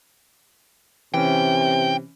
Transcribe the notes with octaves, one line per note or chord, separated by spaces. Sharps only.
C3 E3 C#4 G5